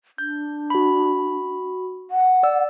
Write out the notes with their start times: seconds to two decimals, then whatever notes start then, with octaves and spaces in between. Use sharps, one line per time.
0.18 D4 G6
0.70 F#4 B5
2.11 F#5
2.43 D5 E6